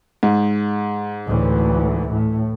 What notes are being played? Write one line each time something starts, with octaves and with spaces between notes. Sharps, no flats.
G#2
D2 A2 E3
A2